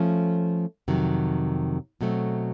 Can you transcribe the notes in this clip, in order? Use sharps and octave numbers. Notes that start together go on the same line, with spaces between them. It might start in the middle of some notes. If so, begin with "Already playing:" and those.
Already playing: F3 A3 C#4
F2 C3 D#3 F#3
B2 F#3 A3 C4